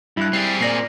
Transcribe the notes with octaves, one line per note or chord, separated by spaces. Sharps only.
G2 E4 F#6
G3 C4 G#4
A#2 D5 A#6 C7